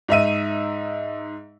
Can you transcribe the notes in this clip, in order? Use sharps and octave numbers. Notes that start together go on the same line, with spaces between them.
G#2 D#4 E5 D#7